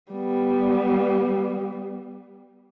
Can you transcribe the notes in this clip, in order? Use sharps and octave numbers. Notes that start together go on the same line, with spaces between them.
G3 B3